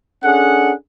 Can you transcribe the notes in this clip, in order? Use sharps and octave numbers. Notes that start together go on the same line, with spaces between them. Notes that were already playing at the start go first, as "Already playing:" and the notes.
C#4 D4 G#4 A4 F#5